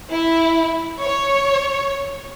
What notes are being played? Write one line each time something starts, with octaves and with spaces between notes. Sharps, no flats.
E4
C#5